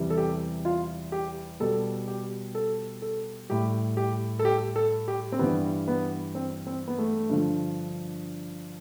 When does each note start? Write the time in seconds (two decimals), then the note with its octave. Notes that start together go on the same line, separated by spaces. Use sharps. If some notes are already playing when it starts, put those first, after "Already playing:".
Already playing: E2 C3 E3 G3
0.10 A4
0.17 G4
0.65 F4
1.12 G4
1.60 B2 G3 A4
2.08 G4
2.55 A4
3.02 A4
3.49 A2 G3 G4
3.97 G4
4.39 A4
4.45 G4
4.76 A4
5.08 G4
5.32 C4
5.39 G2 E3 G3 B3
5.88 B3
6.35 C4
6.67 C4
6.88 B3
6.98 A3
7.29 G2 D3 F3